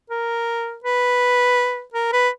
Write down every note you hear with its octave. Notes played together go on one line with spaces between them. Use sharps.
A#4
B4
A#4
B4